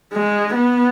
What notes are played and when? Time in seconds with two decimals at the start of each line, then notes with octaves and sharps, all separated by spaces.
0.13 G#3
0.54 B3